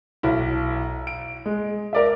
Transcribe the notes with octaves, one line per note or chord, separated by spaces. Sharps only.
B1 E4
D7
G#3
A#4 D5 E5